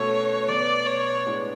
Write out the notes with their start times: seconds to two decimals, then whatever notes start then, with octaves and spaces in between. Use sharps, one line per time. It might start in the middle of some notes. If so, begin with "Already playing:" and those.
Already playing: B2 A3 C#4 F#4 A4 C#5
0.48 B2 F#3 B3 D5
0.87 C#5
1.26 A2 G#3 B3 D4